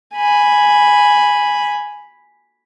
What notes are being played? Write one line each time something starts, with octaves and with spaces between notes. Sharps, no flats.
G#5 B5